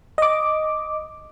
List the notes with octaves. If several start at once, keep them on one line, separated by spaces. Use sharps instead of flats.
D#5 D6